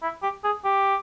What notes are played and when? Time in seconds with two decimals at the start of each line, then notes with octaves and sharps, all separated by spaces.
0.02 E4
0.22 G4
0.44 G#4
0.64 G4